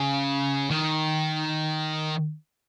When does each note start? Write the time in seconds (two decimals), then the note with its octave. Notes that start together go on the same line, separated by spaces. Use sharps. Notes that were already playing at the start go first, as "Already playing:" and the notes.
Already playing: C#3
0.71 D#3